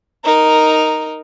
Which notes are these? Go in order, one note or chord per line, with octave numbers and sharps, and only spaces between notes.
D#4 A#4